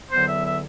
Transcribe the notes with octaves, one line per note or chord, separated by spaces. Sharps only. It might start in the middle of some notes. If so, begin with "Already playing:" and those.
E2 D3 F#3 B3 C5
E5
E5